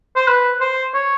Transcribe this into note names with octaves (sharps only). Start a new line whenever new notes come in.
C5
B4
C5
C#5